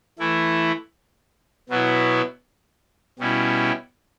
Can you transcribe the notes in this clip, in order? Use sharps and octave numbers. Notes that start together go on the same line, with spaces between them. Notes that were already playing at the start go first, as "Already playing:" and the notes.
E3 A3 E4
B2 F#3 B3 E4
B2 G3 C#4 E4